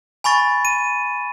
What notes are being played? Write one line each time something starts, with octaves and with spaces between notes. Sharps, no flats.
G#5 B5 C#6 A6
D#7